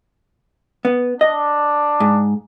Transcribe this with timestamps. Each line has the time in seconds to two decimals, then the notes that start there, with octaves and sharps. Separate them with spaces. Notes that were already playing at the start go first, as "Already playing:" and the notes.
0.85 B3
1.21 D4 D#5
2.00 G#2